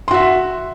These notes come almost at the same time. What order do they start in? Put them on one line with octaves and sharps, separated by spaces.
C6 F#4 E5